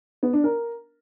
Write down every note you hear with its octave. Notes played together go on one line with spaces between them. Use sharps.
B3
D4
A#4